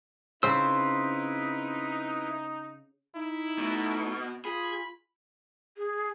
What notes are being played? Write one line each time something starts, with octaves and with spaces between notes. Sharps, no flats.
C#3 C4 D#4 E4 B4 C5 E6
D#4 E4
B2 A3
F4 G#4 B5
G#4